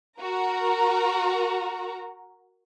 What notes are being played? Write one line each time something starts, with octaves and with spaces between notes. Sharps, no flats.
F#4 A#4 A#5